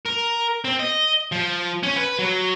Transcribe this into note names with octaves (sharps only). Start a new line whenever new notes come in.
A#4
C4
D#5
F3
C#4
B4
F#3